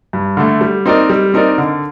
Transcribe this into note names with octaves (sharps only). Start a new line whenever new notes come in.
G2
D3 A3
G3
C4 D#4 A#4 D5
G3
C4 D#4 A#4 D5
D3